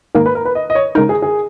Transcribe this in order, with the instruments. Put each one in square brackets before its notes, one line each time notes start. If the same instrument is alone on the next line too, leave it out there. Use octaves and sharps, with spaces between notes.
[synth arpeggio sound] G#2 D#3 A#3 [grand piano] A#4
[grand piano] B4
A#4
B4
D#5
D#5
C#5
[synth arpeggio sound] C#3 G#3 D#4 [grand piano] A#4
[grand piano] G#4
G#4